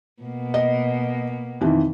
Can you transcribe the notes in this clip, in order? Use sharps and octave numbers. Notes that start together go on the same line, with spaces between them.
B2 A#3
D#5
F2 D#3 E3